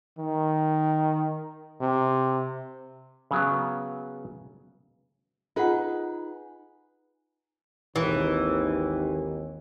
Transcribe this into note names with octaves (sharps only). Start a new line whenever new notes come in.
D#3
C3
C#3 F#3 B3
D#4 F4 G#4 B4 F#5
G#1 D#2 E3